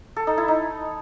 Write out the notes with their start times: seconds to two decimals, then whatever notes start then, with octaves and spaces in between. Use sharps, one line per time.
0.16 A4
0.27 D#4
0.38 E4
0.48 D#4